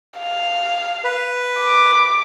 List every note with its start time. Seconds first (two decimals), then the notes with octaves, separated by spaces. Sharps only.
0.19 F5
1.04 B4
1.59 D6